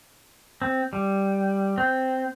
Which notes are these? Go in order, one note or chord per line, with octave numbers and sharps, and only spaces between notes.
C4
G3
C4